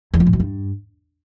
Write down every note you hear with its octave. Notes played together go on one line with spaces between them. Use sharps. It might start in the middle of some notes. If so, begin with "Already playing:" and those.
E2
F3
A2
F#2
G2